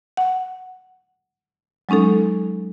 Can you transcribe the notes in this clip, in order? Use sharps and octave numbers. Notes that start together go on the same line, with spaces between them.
F#5
F#3 G#3 C#4 D#4 A4